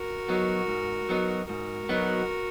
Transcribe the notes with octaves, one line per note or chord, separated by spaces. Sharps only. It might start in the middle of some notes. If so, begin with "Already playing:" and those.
Already playing: F#4 A#4
F#3 B3 D#4
G#2
F#3 B3 D#4
G#2 F#4 A#4
F#3 B3 D#4